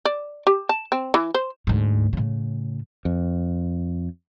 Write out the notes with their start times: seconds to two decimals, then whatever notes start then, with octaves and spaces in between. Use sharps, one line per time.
0.05 D5
0.47 G4
0.69 A5
0.92 C4
1.14 E3
1.34 C5
1.67 D2 G#2
2.13 A2 C#3
3.05 F2